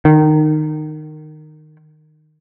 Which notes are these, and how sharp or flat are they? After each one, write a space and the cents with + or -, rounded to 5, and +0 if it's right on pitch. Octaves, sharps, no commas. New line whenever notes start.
D#3 -20